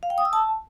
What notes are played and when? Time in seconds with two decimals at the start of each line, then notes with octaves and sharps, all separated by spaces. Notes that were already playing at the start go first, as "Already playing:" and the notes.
0.03 F5
0.10 G5
0.18 D#6
0.25 E6
0.33 A5